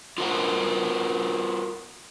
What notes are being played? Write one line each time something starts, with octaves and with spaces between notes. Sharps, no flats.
F4 F#4 A#4 C5 D#5 F#5